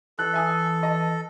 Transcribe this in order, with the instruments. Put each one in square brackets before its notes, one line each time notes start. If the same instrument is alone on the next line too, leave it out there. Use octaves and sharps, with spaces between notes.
[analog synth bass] E3 [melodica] A4 [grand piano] F#6
[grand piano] E5 G#5 D#6
D#5 A5